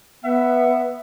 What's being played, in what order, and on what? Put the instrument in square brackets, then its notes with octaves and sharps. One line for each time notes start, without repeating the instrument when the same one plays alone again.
[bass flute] B3 [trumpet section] E5 F#5